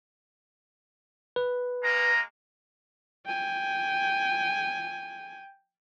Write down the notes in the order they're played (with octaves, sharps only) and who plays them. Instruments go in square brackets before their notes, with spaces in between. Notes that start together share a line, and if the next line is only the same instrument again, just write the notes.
[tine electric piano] B4
[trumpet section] G#3 A#3 A#5
[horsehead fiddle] G5 G#5